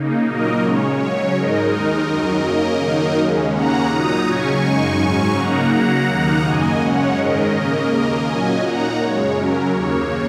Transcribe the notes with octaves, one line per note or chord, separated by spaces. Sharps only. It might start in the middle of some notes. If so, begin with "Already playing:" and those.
Already playing: C#3 A#3 D#4
A#2 F#3 A#3 D#4 A#4 D#5
C#3 G#3 C#4 C#5
C#3 F#3 C#4 C#5
G#2 G#3 D#4 A#4 D#5
D#2 D#3 G#3 D#4
F#2 D#3 F#3 D#4
C#3 A#3 C#4 A#4 D#5
F#2 D#3 F#3 A#3 D#4
D#2 C#3 G#3 C#4
D#2 C#3 A#3 C#4 F#5 A#5
A#2 F#3 D#4 A#5 D#6
C#3 F#3 C#4 G#5 C#6
F#2 C#3 G#3 D#4 G#5 C#6
G#2 F#3 C#4
C#3 A#3 D#4 F#5 A#5
C#3 F#3 A#3 F#5 A#5
D#2 D#3 A#3 D#4 F#5 A#5
F#2 C#3 A#3 D#5 G#5
F#2 C#3 G#3 C#4 C#5 F#5
G#2 D#3 G#3 C#4 A#4 D#5
C#3 A#3 C#4 A#4 D#5
D#2 C#3 A#3 A#4 D#5
A#2 F#3 C#4 D#5 G#5
A#2 A#3 D#4 F#5 A#5
F#2 C#3 G#3 C#5
F#2 C#3 F#3 C#4 A#4
D#2 C#3 A#3 C#5